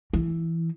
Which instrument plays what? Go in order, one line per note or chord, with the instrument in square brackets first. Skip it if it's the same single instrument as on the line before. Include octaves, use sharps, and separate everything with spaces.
[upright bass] E3